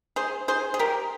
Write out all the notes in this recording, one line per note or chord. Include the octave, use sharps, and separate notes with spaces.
G#4 C5
G#4 C5
G#4
G4 A#4